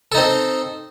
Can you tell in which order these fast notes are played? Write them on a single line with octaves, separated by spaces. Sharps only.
A4 D#4 C4